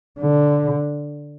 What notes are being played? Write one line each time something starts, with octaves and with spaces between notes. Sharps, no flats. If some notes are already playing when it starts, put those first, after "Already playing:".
D3